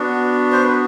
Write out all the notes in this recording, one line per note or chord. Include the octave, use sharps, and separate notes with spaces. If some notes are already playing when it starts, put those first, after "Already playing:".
Already playing: B3 D4 F#4
C5
B4